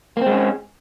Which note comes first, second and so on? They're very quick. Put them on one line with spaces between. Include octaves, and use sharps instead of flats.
A#3 C4 G#3 C#4